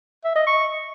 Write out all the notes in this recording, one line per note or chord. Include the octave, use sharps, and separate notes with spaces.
E5
D#5
C#6